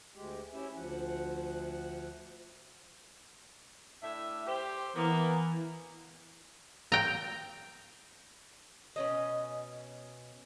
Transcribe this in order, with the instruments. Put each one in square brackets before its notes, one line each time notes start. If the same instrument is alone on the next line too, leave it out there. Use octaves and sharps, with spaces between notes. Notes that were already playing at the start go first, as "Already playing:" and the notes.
[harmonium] D2 G#3 G4
C#4 E4 G4 E5
D2 F3 F#5
[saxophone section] A2 D4 E5
G4 C5
[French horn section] E3 [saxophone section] A#3 B3
[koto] G5 A#5
[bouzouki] B2 C#4 D#5